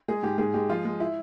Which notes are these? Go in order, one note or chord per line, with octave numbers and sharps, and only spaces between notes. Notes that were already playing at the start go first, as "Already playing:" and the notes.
G#3 G#4
G#2 G4
G#2 G#4
G#3 G4
F3 F4
G#3
E4